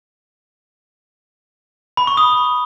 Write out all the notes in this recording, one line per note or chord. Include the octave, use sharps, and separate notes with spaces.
B5
C#6
D#6